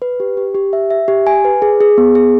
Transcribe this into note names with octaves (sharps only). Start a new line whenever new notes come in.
B4
G4
G4
G4
E5
E5
G4
G#5
B4
G#4
G#4
B3
G#4